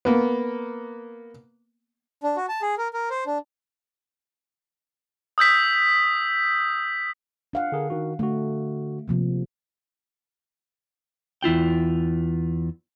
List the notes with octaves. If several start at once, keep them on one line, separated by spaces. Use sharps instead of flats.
A#3 B3
D4
F#4
A5
G#4
A#4
A#4
C5
D4
D#6 E6 G6 B6
D4 F5 F#5
D3 G#4 A#4
D#3 F#4
D3 A3 F#4
C3 F3 A#3
E2 E4 F4 G5